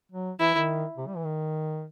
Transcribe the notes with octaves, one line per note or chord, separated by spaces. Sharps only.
F#3
E3 E4
D#3
C3
G3
E3
D#3